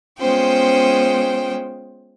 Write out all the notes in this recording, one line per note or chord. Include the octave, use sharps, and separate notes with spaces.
G#3 B3 C#4 F4 C5 G5